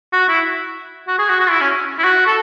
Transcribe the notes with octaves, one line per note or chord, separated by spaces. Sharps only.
F#4
E4
F#4
G#4
F#4
F#4
E4
C#4
E4
F#4
A4